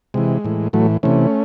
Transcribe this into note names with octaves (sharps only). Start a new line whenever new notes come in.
C3 E3 G#3
A2 E3
A2 E3 F#3 A3
C3 E3 A3 C#4